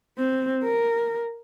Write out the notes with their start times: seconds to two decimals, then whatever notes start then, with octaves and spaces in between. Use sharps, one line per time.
0.18 C4
0.64 A#4